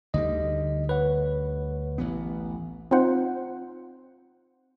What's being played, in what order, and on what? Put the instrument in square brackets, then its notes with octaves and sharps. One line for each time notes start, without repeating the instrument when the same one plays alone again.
[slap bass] D2 D3 G3 [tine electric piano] D#4 D#5
[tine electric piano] B4 C#5 F#5
[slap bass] A1 E3 B3
[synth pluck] C4 D#4 F4 C5 F#5